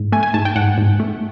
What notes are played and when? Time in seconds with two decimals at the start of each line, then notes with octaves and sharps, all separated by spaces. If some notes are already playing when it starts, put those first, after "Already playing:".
Already playing: G#2
0.12 A3 G#5
0.23 G#5
0.34 G#2 A5
0.45 G5
0.56 G#2 F#5
0.78 G#2
1.00 A3